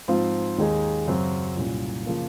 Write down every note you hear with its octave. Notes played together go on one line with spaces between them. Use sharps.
G#2 F3 C4 F4
D#2 D#3 G#3 D#4 G#4
F#2 C#3 F#3 C4
C2 A#2 F#3 C#4
C#3 F3 A#3